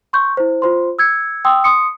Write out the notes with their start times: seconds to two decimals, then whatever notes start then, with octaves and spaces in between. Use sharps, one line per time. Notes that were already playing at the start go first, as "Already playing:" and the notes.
0.13 C6 C#6 G6
0.37 E4 C5
0.62 F4 C5 C6
0.99 E6 G#6 C#7
1.45 G5 C6 D#6 E6
1.64 C6 D#6 C#7